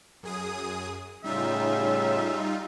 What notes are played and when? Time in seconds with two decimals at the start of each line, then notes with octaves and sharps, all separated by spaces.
0.23 F#2 G#4 D#6
1.24 A2 C#3 G3 C#4 D#4 F4 E5